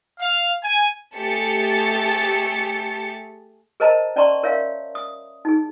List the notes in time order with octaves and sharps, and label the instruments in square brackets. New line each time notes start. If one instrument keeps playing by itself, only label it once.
[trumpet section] F5
G#5
[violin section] A3 G4 G#4 A5 A6 C#7
[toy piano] G#4 A#4 C5 D#5 A5 A#5
C#4 D5 A5 A#5 C6 C#6
A#4 C#5 E5 F5
D#6
D#4 G#4